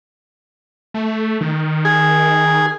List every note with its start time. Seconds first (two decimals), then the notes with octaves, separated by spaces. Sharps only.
0.94 A3
1.41 D#3
1.85 G#4